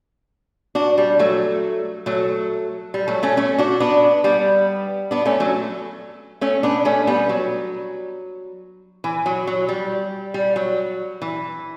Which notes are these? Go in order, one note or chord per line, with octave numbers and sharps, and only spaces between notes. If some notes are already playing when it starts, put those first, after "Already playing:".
D4 F#4
G3
F#3 A3
F#3 A3
G3
F#3 A3
A3 C#4
A3 C#4
D4 F#4
B3 D4
G3 B3
B3 D4
A3 C#4
F#3 A3
A3 C#4
B3 D4
A3 C#4
G3 B3
F#3
E3
F#3
F#3
G3
G3
F#3
E3